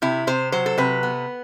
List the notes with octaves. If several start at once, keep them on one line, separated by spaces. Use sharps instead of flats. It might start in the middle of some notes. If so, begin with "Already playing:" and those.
C3 E4
C3 C5
F#3 C5
A4
C3 B4
B3